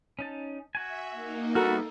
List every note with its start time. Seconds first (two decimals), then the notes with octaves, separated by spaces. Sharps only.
0.19 C#4 D#4 A5
0.75 F#4 E5 G#5
1.11 A#3 D#4
1.55 G3 B3 F#4 A4 A#4 F6